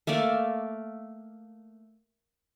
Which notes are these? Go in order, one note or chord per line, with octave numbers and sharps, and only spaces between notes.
A3 A#3 A4 D5